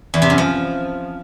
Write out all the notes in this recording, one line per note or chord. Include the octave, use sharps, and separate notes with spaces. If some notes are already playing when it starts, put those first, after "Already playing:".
E2
C3
F#2
F3